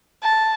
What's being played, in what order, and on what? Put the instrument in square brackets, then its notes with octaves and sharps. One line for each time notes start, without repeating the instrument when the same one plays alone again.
[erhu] A5